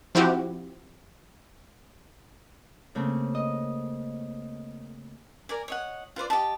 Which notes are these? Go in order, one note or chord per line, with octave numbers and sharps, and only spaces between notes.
F3 C4 E4 F#4 G4
C#3 A3 A#3 C4
D#5
A#4 D5 G#5
C#5 D#5 F#5
F4 B4 C5 D5
G4 D#5 A5